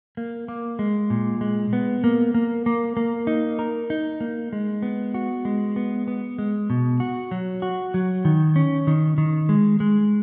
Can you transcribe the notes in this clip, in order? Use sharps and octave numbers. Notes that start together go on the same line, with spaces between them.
A#3
A#3
G#3
A#2
G#3
B3
A#3
A#3
A#3
A#3
D#4
A#4
D#4
A#3
G#3
B3
F#4
G#3
B3
B3
G#3
B2
F#4
F#3
F#4
F#3
D#3
C#4
D#3
D#3
G#3
G#3